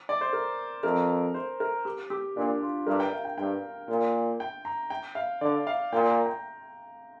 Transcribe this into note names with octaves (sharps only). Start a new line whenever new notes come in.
D5
C5
A#4
F2 A#4
C5
A#4
G4
G4
A#2 D4
F4
G2 A#4
G5
F5
G5
G2 G5
A#2
G5
A#5
G5
F5
D3 D5
F5
A#2 G5
A#5
G5